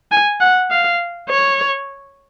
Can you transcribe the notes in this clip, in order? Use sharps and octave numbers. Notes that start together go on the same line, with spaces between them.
G#5
F#5
F5
C#5